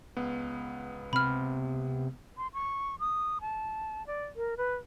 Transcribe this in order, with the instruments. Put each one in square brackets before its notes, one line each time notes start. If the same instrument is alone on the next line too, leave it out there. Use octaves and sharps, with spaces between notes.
[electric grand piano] C#2 B3
[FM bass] C3 [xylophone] B5 F6
[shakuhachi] C6
C#6
D#6
A5
D5
A#4
B4